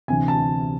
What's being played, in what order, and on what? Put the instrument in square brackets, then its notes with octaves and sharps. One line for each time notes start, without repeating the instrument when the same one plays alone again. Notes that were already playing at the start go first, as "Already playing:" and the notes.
[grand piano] D2 C3 E3 G#5
A5